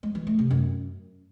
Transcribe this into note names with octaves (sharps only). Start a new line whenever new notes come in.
G#3
E3
A3
C3
F#2